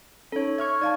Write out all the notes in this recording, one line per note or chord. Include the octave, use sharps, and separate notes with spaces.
C#4 D#4 A4 C#5
E5 C#6 F6 G#6
D#4 D5 F5 A5 G#6